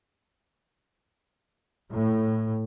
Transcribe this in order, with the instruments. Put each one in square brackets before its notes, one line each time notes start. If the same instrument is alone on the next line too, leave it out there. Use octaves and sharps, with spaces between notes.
[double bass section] A2